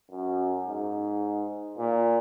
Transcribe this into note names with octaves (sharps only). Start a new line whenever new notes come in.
F#2
G#2
A#2